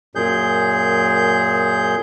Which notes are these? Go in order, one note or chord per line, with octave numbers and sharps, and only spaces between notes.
F#2 A#2 G#4 G6